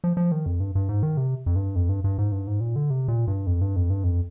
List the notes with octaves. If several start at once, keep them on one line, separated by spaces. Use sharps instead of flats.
F3
F3
D#3
F2
G2
G2
G#2
D#3
C3
F2
G2
F2
G2
G2
G#2
G2
G#2
A#2
D3
C3
A#2
G2
F2
G2
F2
G2
F2